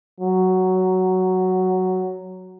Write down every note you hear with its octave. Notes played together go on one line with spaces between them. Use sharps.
F#3